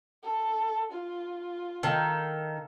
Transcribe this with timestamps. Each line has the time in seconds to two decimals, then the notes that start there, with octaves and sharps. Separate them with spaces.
0.23 A4
0.92 F4
1.83 D#3 A4 F5 A#5